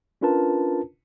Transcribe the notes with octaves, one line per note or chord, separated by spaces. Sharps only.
C#4 D4 F4 A#4 B4 A5